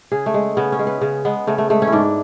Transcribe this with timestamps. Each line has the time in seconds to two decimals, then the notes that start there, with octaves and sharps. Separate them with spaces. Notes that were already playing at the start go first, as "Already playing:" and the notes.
0.12 C#3 G#4
0.26 A3
0.34 G#3
0.57 C#3 B3
0.72 C#4
0.79 G#3
0.87 B4
1.01 C#3
1.25 G#3 B3
1.47 C#3 A3
1.58 A3
1.70 G#3 A3
1.82 C#4
1.87 E4
1.92 G#2 D4